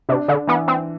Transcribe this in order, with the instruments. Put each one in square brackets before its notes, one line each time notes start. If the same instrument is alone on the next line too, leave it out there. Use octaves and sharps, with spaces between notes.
[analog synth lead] C3 [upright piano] D4
[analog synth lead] D3
[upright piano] E3 [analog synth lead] B3
[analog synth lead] C4